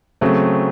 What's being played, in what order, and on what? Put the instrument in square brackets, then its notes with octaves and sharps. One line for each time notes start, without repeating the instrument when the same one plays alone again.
[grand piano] C#3 F#3 A3 C4